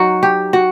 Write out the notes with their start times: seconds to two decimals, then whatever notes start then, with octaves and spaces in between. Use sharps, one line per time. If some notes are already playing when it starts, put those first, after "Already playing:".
Already playing: F#3 D#4 F#4
0.23 G4
0.53 F#4